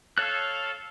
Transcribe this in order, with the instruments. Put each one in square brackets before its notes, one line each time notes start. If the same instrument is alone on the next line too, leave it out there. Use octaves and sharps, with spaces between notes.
[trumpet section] A4 F5 [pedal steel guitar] C#5 F#6